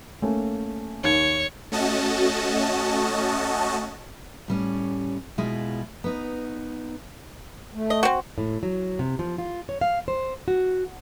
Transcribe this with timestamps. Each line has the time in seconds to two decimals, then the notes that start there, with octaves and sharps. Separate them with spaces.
0.22 A3 A#3 C#4
1.04 D#2 C#5 G#6
1.72 A3 C#4 F#4 D#5 A5
4.48 A2 G3 C#4
5.38 B2 G#3 E4 F4
6.04 B3 D#4
7.74 A3
7.90 D#5
8.03 C4 F#4
8.38 A2
8.63 F#3
8.99 C3
9.19 F3
9.38 F4
9.69 C#5
9.81 F5
10.08 C5
10.48 F#4